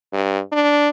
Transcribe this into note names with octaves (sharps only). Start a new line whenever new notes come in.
G2
D4